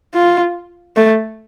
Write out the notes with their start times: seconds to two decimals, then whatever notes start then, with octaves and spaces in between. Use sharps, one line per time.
0.15 F4
0.96 A3